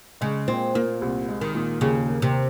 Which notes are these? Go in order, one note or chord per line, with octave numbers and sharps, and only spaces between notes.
C#3 G#3
A#2 C4
A#2 A#3
C2
G#3
D#3
A#2
D#2 C#3
A#3
C3